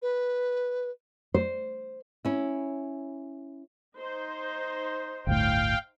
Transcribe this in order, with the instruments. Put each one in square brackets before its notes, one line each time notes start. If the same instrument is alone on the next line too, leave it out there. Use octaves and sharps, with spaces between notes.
[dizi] B4
[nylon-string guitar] C5
C#4 E4
[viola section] D#4 C5
[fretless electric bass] G1 D2 A2 [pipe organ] F5 G5